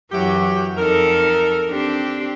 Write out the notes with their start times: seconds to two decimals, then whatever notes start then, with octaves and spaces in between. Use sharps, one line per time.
0.12 F#2 E3 F#3 E4 F#4 G4
0.77 F2 D#4 A4 A#4
1.70 C4 D4 G4